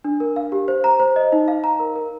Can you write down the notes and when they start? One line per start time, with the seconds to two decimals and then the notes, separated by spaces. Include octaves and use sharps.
0.04 D4
0.20 A#4
0.36 F5
0.52 G4
0.68 C5
0.84 A#5
1.00 C5
1.16 D#5
1.32 D#4
1.48 F5
1.64 A#5
1.80 A#4
1.96 A#4